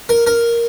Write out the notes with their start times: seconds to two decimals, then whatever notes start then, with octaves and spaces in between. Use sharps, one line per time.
0.09 A#4
0.27 A#4